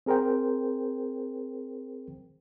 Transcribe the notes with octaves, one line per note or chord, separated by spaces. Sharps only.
C4 G#4 A#4 C5 G5